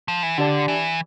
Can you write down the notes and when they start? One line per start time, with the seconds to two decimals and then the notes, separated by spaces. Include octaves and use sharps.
0.08 F3
0.23 E3
0.38 D3 D4 G4 D5 A5
0.68 E3